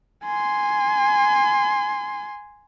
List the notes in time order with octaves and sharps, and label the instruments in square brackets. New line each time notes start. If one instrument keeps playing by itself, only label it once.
[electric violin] G#5 C6